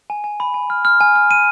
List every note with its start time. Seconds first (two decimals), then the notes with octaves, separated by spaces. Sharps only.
0.10 G#5
0.24 G#5
0.40 B5
0.54 G#5
0.70 F6
0.85 F6
1.01 G#5
1.16 F6
1.31 D#7